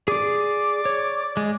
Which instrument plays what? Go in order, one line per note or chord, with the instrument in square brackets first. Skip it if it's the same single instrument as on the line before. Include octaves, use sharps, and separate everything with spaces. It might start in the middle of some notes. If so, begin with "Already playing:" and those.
[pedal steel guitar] G#4 D6 [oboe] D5
[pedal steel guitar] C#5
G#3